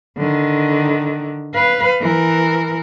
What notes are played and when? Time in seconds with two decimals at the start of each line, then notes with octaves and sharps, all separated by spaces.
0.17 D3 D#3
1.54 B4 F5
2.01 E3 A#4